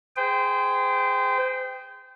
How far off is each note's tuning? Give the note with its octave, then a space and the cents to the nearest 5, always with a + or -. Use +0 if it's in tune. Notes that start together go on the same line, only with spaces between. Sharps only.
G#4 -10 C5 -30 G5 +5